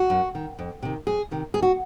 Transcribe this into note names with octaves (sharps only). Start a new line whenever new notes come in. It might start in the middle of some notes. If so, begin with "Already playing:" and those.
Already playing: F#4
F#2
D#3
F2
C3 D#3
F2 G#4
C3 D#3
D#2 G#4
F#4